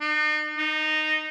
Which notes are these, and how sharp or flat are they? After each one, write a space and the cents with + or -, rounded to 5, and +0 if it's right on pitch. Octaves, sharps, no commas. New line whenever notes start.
D#4 -45
D#4 -10